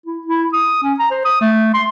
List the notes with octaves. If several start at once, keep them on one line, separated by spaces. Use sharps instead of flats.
E4
E4
D#6
C#4
A#5
C5
D#6
A3
C6